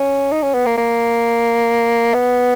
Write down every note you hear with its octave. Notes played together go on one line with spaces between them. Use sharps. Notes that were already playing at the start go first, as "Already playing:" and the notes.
Already playing: C#4
D#4
C#4
B3
A#3
A#3
B3